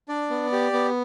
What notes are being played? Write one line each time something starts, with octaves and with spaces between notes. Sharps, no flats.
D4 D5
B3
G4
B3